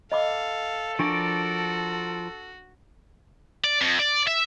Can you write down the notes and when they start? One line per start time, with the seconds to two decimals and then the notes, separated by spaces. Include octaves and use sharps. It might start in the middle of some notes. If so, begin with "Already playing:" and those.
0.12 A4 D#5 F5 B5 D6
0.99 F3 D4 F#4 A#4 D5 C#6
3.64 D5
3.81 F2
3.99 D5
4.27 E5